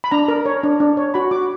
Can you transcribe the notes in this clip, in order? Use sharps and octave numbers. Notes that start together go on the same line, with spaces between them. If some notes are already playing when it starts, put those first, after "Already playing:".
B5
D4 A#5
A#4
C#5
D4
D4
C#5
F#4 B5
F#4 D6